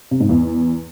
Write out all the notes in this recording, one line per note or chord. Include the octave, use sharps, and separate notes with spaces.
C3
G#2
E2